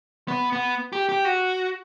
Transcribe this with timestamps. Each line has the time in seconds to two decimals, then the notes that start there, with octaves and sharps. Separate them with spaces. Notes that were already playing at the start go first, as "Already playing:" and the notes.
0.28 B3
0.53 B3
0.93 G4
1.09 G4
1.25 F#4